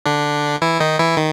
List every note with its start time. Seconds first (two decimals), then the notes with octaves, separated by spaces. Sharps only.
0.06 D3 D4
0.62 E3 E4
0.80 D#3 D#4
0.99 E3 E4
1.17 D#3